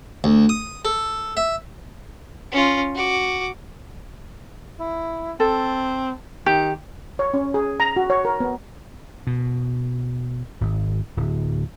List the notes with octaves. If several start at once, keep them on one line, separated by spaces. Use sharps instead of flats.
D2
D#6
A4
E5
C#4 F4
F#4 D6
E4
C4 A4
D#3 G4
C#5
C#4
G#4
A#5
F#4
C#5
A#4
B3
B2
G#1
D1